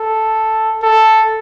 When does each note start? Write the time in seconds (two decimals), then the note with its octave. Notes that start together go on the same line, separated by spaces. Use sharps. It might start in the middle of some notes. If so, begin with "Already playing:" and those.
Already playing: A4
0.83 A4